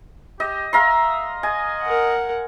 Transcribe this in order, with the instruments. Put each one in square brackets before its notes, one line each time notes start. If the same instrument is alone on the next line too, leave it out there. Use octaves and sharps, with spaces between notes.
[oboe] G4 [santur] D#5
[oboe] E5 [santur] F5 A#5 C6
[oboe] D#5 [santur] G#5
[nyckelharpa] A#4 F#5